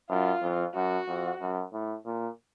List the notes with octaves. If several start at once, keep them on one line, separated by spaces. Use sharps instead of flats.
F#2 F4
F2
F#2 F#4
F2
F#2
A2
A#2